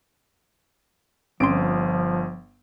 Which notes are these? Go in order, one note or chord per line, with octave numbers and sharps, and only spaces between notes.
G1 F3 C4 C#4 C6 D7